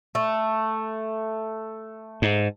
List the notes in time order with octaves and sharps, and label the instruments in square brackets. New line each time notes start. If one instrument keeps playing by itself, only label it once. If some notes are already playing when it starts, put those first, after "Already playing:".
[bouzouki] A3
[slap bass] G#2